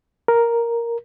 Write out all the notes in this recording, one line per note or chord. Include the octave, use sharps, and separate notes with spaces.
A#4